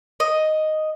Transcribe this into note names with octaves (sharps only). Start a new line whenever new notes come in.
D#5